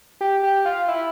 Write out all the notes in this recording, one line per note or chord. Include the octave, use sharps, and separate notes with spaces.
G4
G4
F4
E4